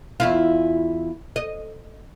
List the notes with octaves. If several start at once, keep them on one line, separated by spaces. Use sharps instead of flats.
E2 E4 F4
D#5